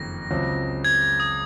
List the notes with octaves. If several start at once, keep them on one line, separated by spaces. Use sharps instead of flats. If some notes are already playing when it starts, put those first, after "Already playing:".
Already playing: F#1 F2 D#3 A#6
C#2 C#3 F#3 C4
G#6
G#6
D#6